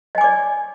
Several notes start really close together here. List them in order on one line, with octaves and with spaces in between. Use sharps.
D#5 G#5 D6 D5